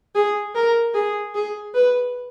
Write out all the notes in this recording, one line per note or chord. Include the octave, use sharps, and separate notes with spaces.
G#4
A#4
G#4
G#4
B4